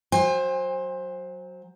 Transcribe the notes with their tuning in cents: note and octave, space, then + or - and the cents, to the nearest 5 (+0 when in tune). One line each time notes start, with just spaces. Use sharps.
F#3 +0 C5 +15 G#5 -40